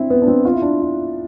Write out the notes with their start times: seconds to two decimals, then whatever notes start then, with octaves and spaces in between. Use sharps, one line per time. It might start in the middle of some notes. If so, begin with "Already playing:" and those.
Already playing: C4 D4 E4
0.10 B3
0.22 D4
0.27 C4
0.45 F4
0.53 E4
0.62 D4
0.80 E4